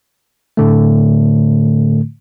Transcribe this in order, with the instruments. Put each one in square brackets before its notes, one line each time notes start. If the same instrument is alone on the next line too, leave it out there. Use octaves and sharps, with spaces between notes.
[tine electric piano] A2 D3 A3